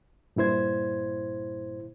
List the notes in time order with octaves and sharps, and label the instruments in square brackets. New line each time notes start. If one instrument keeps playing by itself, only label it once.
[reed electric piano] G2 A#2 E4 C5 G#6